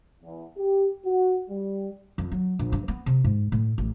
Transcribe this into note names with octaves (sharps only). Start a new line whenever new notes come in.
E2
G4
F#4
G3
F2
F#3
A#1
G2
B3
C3
G#2
A2
A1